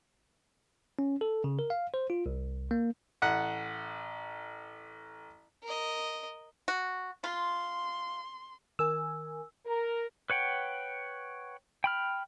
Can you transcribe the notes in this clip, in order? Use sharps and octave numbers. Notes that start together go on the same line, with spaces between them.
C#4
A4
C#3
A#4
F5
C5
F4
C2
A#3
A1 F#5
A#4 D#5
F#4
F4 C6
D#3 A#4 G#5 E6
A#4
B4 C#5 F#5 G5
G5 B5 F6